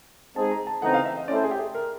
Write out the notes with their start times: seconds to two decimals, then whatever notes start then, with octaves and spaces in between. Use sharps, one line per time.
0.36 G#3 C4 D#4 G#4 A5
0.51 A#5
0.67 A5
0.82 C#3 E3 A3 C4 D#4 F#5
0.94 F5
1.05 E5
1.17 D#5
1.28 A3 C#4 E4 A4 C5 D5
1.44 G#4
1.51 G4
1.59 G#4
1.75 A#4